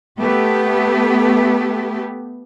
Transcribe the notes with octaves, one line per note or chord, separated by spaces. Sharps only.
A3 B3 G4